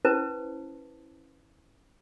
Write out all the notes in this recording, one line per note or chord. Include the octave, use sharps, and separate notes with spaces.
C#4 E4 B4 C5 A5